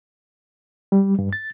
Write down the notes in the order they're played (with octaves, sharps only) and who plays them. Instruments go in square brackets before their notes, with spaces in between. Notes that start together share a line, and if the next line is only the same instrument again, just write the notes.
[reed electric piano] G3
G2
A6